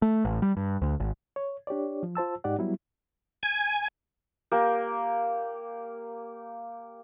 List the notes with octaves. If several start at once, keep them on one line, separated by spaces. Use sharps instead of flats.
A3
A1
G3
G2
D2
G#1
C#5
D4 G4 C#5 D5
F3
F4 C5 A5 E6
G#2 D#4 G4 D5 F#5
F#3 G3 B3 E4
G#5
A#3 G4